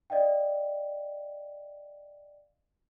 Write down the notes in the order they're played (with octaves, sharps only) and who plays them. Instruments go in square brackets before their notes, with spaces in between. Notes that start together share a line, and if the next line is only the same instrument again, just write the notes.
[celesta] D5 D#5 F5 G5